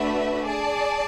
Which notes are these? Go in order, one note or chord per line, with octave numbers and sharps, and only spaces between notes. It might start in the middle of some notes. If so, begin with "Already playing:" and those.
Already playing: A3 D4 F#4 B4 E5
G#4 D5 A5